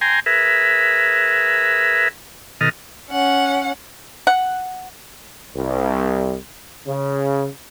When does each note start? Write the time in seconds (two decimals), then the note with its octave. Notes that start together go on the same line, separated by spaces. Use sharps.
0.01 G5 G#5 A#5 C6
0.26 G#4 A#4 B4 E5
2.61 B2 D#3 A4 D#5 F6
3.09 C#4 F#5
4.27 F#5
5.55 C2
6.87 C#3